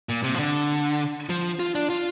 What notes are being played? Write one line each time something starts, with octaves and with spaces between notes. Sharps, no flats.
A#2
C3
F3
D3
F3
F4
D4
F4